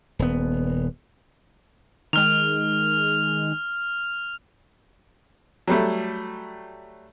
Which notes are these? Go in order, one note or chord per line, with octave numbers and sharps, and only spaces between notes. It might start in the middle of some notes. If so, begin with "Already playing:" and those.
D#1 B3
D#3 G#3 F6 F7
F#3 G3 A3